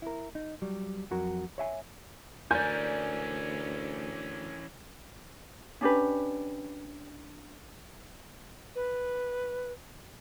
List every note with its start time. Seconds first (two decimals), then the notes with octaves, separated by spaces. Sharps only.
0.02 E4 A#4
0.35 D#4
0.62 F#3 G3
1.11 F2 F#3 F#4 A#4
1.58 C#5 E5 G#5
2.51 D2 E3 C#4 A#4 D5 G#5 G6
5.81 C#4 D4 G4 B4
8.75 B4